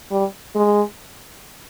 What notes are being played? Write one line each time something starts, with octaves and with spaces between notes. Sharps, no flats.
G3
G#3